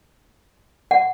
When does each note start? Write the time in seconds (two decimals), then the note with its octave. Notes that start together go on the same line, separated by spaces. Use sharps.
0.91 F#5